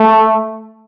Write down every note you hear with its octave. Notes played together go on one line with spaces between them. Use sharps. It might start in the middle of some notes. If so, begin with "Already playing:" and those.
Already playing: A3